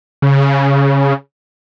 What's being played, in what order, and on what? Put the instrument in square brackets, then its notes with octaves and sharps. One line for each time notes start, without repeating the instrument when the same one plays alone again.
[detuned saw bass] C#3